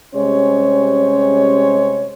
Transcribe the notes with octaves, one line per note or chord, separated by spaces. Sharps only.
C3 G3 G#3 C#4 C5 C#5